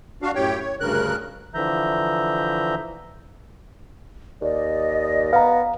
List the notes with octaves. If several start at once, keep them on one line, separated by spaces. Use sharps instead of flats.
D4 F#4 F5
F#2 A2 G4 C#5 G5
C#5
D2 G2 C#3 A#4 F#6
D3 E3 F3 E5 A#5 G6
D#2 D5 D#5
B3 F5 A#5